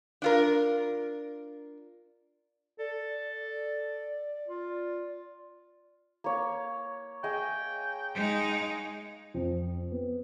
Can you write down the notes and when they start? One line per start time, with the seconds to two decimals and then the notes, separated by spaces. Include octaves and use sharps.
0.22 D4 F4 A#4
2.79 A4 D5
4.48 F4
6.24 A#3 C#5
7.24 G#4 D#5 E5 G5
8.15 G#3 D#4
9.34 F2
9.92 B3